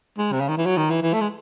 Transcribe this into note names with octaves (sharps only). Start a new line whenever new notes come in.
G#3
C3
C#3
D#3
E3
F#3
D#3
E3
E3
A3
G#3